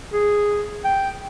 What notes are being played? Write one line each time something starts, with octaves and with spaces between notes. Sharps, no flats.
G#4
G5